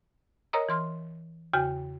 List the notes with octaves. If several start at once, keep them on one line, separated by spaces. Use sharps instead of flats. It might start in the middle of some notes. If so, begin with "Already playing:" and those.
A#4 C#5 D#5 A#5 D#6
E3 C6 F6
E2 C#3 F#4 G5